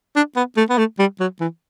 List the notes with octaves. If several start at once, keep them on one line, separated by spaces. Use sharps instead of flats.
D4
B3
A3
B3
A3
G3
F#3
E3